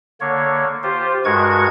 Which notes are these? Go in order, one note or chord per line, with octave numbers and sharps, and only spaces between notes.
D3 A#3 C#5
F4 G4 C5
G2 G#3 F#4 A#4 C#6 G#6